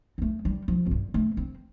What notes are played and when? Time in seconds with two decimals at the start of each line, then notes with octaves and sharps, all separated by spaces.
0.18 C4
0.22 A3
0.45 G3
0.68 F3
0.86 F2
0.91 G2
1.14 A3
1.37 C4